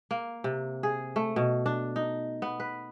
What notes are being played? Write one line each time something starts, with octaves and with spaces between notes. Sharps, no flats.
A#3
C3
G#4
A3
B2
D4
D#4
B3
B4